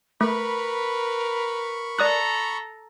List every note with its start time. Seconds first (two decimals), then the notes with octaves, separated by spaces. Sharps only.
0.21 A3 A#4 B4 B5 C#6
1.99 A4 D5 A#5 D#6 F#6